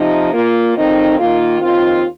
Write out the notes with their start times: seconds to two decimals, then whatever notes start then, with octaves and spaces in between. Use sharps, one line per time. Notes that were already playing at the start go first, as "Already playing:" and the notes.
Already playing: C3 F3 D#4
0.34 A#2 A#3 F4
0.76 F2 D#3 C4 D#4
1.19 D#3 A#3 F4
1.61 D#2 D#3 C4 F4